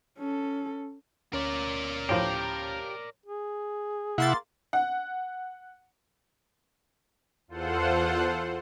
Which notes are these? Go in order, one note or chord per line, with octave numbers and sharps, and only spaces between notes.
C#4 A4
D2 C#4 A#4 C#5 D5
A2 F3 G4
G#4
C3 A#3 E4 F#5 C6 A6
F#5
E2 F4 A4 C5 F#5